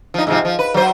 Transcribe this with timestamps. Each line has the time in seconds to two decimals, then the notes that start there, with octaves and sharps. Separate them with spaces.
0.14 F3 D#4
0.27 G#2 C3 F3
0.45 F3
0.59 B4
0.74 F#3 C5